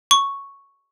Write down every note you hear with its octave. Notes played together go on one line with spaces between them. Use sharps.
C#6